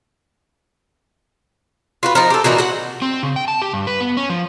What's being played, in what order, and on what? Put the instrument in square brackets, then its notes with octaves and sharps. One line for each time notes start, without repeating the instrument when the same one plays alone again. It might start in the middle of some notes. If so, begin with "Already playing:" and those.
[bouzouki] F4 F#4 B4
F3 D#4 A#4
G4 A4
A#2 E3 D#4 F#4
F#4 F#5
[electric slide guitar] C4
C#3
G5
A5
G4
G2
B4
B3
C#4
F3